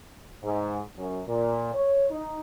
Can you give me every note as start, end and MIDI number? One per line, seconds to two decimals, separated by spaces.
0.43 0.79 44
0.97 1.20 42
1.27 1.70 46
1.73 2.06 73
2.10 2.40 63